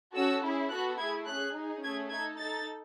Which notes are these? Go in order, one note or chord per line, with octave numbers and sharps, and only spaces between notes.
C#4 F#4 A4 E6
C#4 E4 G#4
B3 F#4 A4 F#6
A3 E4 G#4 G#6
C#4 G#4 F#6
D#4 G#4
A3 C#4 G#4 G#6
D#4 A4 G#6
D#4 A4 A6